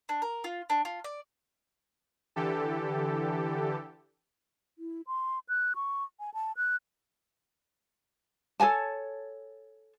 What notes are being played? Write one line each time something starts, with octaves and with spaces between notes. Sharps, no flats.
D4
A#4
F4
D4
F4
D5
D3 E3 G4 A4
E4
C6
F#6
C#6
G#5
A5
F#6
A4 C#5 G#5 A5